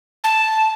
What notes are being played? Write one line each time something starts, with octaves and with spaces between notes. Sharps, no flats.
A5